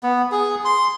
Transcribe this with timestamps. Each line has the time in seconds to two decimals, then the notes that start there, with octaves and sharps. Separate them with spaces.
0.03 B3
0.32 G#4
0.65 C6